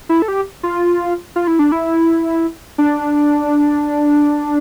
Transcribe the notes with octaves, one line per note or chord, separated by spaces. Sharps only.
E4
A4
G4
F4
F4
E4
D4
E4
D4